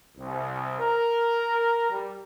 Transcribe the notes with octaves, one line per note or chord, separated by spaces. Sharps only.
C2
A#4
G3